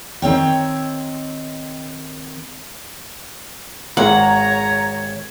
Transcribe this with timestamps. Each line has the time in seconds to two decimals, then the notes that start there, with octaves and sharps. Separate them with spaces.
0.22 D#3 C4 C#5 G5
3.97 G#1 C#5 F#5 A#5